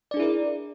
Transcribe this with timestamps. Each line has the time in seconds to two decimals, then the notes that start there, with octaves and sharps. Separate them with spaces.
0.11 D5
0.14 D4
0.17 G#4
0.19 E4
0.22 A#4